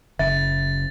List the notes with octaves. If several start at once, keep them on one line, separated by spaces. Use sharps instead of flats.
F#1 C#3 E5 A6